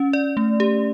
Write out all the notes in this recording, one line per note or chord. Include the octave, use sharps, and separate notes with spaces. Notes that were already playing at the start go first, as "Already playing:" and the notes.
Already playing: C#4
D5
A3
G4